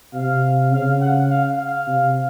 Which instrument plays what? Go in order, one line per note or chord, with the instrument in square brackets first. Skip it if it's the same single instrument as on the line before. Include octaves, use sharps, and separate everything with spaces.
[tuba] C3 [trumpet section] F5
[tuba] C#3 [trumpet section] F5
[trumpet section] F#5
F5
F5
[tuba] C3